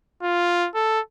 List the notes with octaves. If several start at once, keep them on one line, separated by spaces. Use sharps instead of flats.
F4
A4